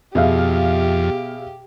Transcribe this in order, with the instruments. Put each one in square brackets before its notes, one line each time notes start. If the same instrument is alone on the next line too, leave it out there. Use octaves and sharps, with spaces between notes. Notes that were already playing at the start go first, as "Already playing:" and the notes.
[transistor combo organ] F2 [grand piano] B2 [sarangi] G4 [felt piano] G#4 E5 F5